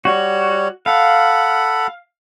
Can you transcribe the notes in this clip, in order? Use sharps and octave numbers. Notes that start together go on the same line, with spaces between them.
G3 F#4 C#5
A4 F5 F#5 B5